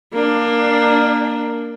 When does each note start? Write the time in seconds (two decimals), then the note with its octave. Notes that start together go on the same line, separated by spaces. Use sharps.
0.13 A#3 D4